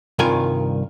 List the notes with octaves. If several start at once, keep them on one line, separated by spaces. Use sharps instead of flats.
C2 G2 D#3 F4 A#4 G#5